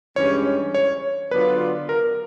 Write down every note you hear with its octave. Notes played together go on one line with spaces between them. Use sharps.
G2 E3 G#3 C#4 C#5
C#5
D3 F#3 B3 D4 F4 B4
A#4